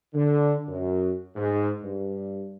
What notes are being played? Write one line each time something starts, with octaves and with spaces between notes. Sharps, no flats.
D3
F#2
G#2
G2